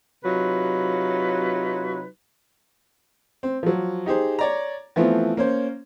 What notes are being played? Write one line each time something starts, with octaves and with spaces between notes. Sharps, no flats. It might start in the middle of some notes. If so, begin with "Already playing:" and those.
C3 F#3 D#4 F4 B4
C4
F3 F#3
D#4 G4 G#4 C5
C#5 D5 A#5
E3 F3 A3 B3 C4
A#3 C#4 C5